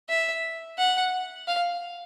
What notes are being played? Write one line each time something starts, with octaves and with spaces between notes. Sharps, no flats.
E5
F#5
F5